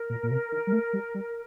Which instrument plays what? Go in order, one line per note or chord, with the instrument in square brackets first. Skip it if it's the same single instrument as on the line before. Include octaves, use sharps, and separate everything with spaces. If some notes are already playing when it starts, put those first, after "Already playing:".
Already playing: [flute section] A#4
[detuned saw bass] A#2
A#2
C3
D#3
G3
A3
G3
G3